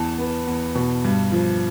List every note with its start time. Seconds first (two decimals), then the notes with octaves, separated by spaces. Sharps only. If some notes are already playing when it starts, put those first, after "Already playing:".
Already playing: E2 A5
0.19 B3
0.47 E2
0.75 B2
1.04 G2
1.32 F3